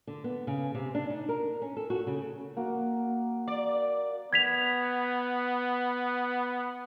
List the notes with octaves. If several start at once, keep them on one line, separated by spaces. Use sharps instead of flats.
D3
B3
C#3
C3
D4
D#4
A#4
C#4
A4
F#4
C#3
A#3 F#4
D5
B3 G#6 B6 F7